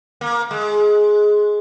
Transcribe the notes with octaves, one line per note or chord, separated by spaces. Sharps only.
A#3
G#3